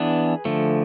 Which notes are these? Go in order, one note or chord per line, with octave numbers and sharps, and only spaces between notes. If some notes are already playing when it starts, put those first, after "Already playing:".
Already playing: E3 B3 D4 G#4 B4
D3 F3 A3